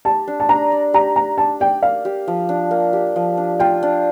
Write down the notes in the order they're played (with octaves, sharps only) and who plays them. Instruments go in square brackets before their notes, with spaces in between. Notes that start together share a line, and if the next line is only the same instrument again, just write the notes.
[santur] G4 [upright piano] A5
[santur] D4
[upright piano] A5
[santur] D4 [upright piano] A#5
[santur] D5
[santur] G4 [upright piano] A#5
[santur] D4 [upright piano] A#5
[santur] D4 [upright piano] A5
[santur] D5 [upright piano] G5
[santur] A#3 [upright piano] F5
[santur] G4
F3
D4
A#3
G4
F3
D4
[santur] F4 [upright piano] G5
[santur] D4